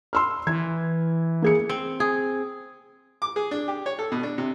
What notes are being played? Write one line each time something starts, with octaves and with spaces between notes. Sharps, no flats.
C6 E6 F6
E3 G#6
A#3 G#4 C#7
C4
G#4
D6
G#4
D4
G4
C#5
A4
B2
D4
C3